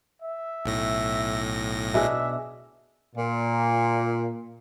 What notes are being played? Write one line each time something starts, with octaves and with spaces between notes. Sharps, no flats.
E5
B1 A2 A#6
B2 D4 G#4 E5
A#2